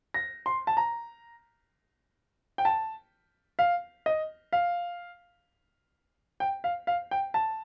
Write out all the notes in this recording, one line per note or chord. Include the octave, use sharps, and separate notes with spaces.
A#6
C6
A5
A#5
G5
A5
F5
D#5
F5
G5
F5
F5
G5
A5